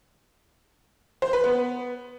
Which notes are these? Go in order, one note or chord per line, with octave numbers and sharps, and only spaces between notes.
C5
B4
B3